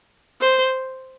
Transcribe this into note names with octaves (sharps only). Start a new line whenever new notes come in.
C5